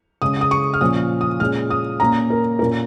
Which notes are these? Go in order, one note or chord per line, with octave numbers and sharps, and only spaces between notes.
C#3 G#3 C#4 D#6
D#6
C#6
F6
A#2 F3 C#4 D#6
D#6
A#2 G#3 C#4 F6
D#6
A#2 A#3 C#4 A#5
A#4
A#2 A#3 C#4 A#4